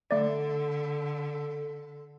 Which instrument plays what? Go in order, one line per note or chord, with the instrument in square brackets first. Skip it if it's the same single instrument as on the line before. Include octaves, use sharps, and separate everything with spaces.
[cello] D3 [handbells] A3 D5 [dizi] A4